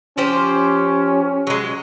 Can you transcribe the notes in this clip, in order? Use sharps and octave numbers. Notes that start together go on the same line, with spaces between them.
F3 C#4 G4 C5
F#3 G#3